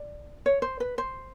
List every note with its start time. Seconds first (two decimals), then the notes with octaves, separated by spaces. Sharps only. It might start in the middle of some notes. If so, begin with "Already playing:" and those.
Already playing: D5
0.46 C#5
0.62 C5
0.80 B4
0.98 C5